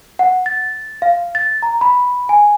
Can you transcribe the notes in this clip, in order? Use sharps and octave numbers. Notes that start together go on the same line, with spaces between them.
F#5
A6
F5
A6
A#5
B5
G#5